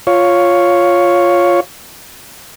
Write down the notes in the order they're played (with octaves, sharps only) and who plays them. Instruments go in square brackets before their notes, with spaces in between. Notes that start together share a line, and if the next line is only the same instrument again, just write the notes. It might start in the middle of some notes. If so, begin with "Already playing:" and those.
[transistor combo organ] F4 C#5